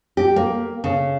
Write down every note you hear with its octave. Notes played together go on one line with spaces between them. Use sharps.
G4
A#3
C#3